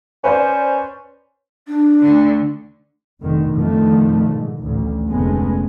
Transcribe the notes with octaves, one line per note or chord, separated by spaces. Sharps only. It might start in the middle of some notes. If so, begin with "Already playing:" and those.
C#4 B4 C5 D5
D4
D2 D3
F1 B2 D3 D#3
F2 B2 D3 D#3 F3 A3
G#2
A1 D2
F1 D2 G#3 A3 B3 C#4